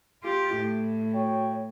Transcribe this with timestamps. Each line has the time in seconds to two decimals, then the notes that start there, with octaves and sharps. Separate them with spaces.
0.24 F4 G4
0.55 A2
1.14 F#4 C#5 G5